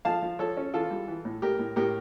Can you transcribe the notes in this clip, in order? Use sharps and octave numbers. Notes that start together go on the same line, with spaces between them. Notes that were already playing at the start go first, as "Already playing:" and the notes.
F3 F5 A5
F3
F3 A4 C#5
C#4
E3 F4 A4
G3
E3
A2
A2 G4 A#4
A2
A2 G4 A#4